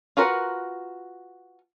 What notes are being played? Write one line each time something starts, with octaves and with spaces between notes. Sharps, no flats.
F4 F#4 A#4 B4 F#5